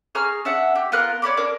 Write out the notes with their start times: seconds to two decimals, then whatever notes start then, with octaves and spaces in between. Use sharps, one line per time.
0.15 G#4 A#5 C#6 F6
0.45 D4 E5 F#5
0.75 G4
0.92 B3 F4 A#4 F#6
1.22 C#5 D5 B5 D6
1.37 D4 A#4 D6